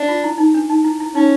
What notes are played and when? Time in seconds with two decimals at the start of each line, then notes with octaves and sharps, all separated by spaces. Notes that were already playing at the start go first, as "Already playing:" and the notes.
Already playing: D4
0.08 F4
0.24 E4
0.38 D#4
0.54 D4
0.70 D#4
0.84 E4
1.00 E4
1.15 C#4 D#4